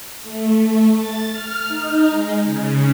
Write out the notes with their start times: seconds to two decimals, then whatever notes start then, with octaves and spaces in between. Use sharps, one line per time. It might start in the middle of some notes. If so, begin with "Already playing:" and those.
0.22 A3
0.57 A3
0.96 A6
1.29 F6
1.68 D#4
2.10 G#3
2.43 C#3